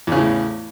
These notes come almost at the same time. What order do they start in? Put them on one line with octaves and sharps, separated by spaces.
E2 C#3 A2